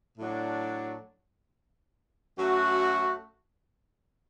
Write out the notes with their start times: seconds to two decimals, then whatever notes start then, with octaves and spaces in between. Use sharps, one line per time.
0.18 A2 F#3 D4
2.36 F#2 F#3 A3 F#4